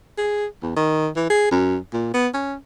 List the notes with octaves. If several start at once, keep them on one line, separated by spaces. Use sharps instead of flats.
G#4
E2
D#3
E3
G#4
F#2
A#2
B3
C#4